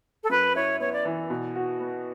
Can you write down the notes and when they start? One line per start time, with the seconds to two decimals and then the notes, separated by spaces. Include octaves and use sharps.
0.23 A4
0.29 F#2 B4
0.55 E4 C#5
0.80 B3 C#5
0.92 D5
1.05 E3
1.30 B2
1.56 F#4
1.80 B3